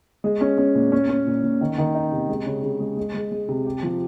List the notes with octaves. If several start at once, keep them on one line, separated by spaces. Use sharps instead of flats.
G#3
C#4
C#4
A#2
C#4
C#4
A#2
A#2
D#3
D#3
D#4
C3
G#3
C#3
C#3
G#3
G#3
G#3
G#3
C3
G4
F3